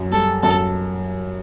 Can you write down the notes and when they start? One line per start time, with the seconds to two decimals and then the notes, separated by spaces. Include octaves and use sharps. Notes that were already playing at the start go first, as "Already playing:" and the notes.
Already playing: F#2
0.11 G3 A4
0.43 F#2 A4